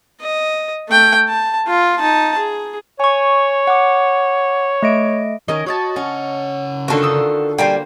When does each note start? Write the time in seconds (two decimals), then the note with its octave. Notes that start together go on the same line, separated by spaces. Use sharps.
0.21 D#5
0.89 A3 G5
1.28 A5
1.68 F4
1.99 D#4 A5
2.38 G#4
3.00 C#5 G#5 C#6
3.67 F#5 D6
4.82 A3 D#5 D7
5.48 D#3 C#4 A#4 D#5
5.66 F#4 C#5 D#5 A5
5.96 C#3 C#4 F#5
6.88 D3 D#3 F4 F#4 A4
7.03 D#6 E6
7.58 G3 A#3 C5 D5 G5 G#5